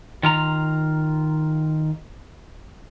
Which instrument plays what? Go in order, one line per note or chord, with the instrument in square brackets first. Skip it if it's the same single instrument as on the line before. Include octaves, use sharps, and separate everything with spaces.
[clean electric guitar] D#3 F4 A#5